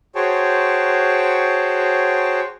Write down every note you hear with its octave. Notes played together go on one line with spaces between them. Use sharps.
F#4 G#4 C5 C#5 G5 A5